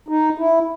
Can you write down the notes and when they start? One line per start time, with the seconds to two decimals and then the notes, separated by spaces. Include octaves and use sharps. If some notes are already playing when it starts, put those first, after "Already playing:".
0.08 D#4
0.38 E4